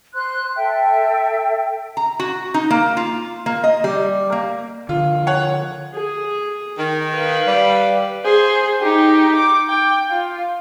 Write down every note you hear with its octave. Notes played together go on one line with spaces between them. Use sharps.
C5 C6 F#6
A4 E5 G5
A#5
F#4
D#4
A#3
F4
A#3
D#5
G3
A#3
D3 F3 F4
C#5 F#5
G#4
D#3
B4 F5
G3
G#4 C5
D#4 G4
D6
G5
F4